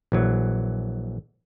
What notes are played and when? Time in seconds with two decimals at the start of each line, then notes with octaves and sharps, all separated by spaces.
0.12 A#1 E3 F#3